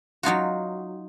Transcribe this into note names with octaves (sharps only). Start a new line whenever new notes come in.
F#3 D#4 F4 F#4